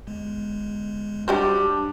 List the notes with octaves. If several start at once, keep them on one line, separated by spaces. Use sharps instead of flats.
G1 E2 G#3
G3 D4 F#4 G4 C5